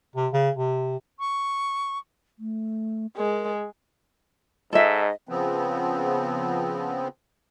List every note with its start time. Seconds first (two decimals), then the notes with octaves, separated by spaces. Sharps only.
0.16 C3
0.33 C#3
0.55 C3
1.19 C#6
2.39 A3
3.17 G#3 A#4
4.73 G#2 A4 D#5 E5
5.29 C#3 F3 B3 C4